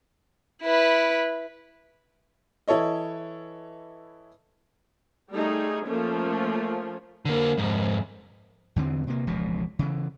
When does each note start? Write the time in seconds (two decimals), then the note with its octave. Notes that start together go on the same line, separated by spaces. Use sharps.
0.63 E4 B4
2.68 E3 E4 A4 C#5 D#5
5.32 G3 A3 D#4 G#4
5.87 F3 A3 A#3 C#4
7.25 D3 A#3
7.58 F2 G#2
8.76 E2 D3 E3 C4
9.07 C3 A#3
9.27 E1 C#2 A#2 F3
9.79 C#3 E3